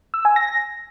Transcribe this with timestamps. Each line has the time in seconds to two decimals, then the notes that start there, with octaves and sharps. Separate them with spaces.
0.14 E6
0.25 G#5
0.36 A#6